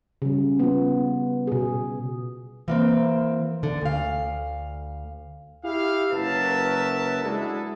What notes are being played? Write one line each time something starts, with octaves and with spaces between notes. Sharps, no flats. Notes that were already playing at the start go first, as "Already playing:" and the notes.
C#3 G3
B3 F4
B2 G#4
E3 A#3 C4
D3
D2 F5
E4 G4 F5
F#1 F#3 A#4 B4 E5 A5
G#3 D4 E4 F#4 G#4 A4